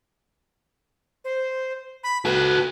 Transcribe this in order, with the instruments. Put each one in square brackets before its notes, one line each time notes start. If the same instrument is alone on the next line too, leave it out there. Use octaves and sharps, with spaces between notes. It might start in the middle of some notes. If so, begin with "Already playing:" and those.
[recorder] C5
B5
[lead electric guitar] F#4 A4 [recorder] B4